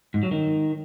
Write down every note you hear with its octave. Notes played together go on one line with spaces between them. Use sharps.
G#2
F#3
D#3